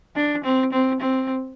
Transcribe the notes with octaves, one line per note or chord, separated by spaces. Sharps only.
D4
C4
C4
C4